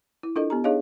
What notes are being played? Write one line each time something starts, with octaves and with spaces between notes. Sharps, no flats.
E4
D4 E4 F4 A4 A#4 D#5
B3 G4 A#5
D4 D#4 G#4 C#5 D#5 F5